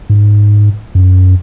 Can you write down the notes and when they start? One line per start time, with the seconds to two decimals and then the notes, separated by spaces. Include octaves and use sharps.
0.10 G#2
0.95 F#2